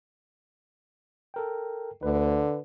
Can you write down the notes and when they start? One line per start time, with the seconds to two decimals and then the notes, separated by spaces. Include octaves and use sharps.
1.34 A4 A#4 G5
2.03 D2 D3 B4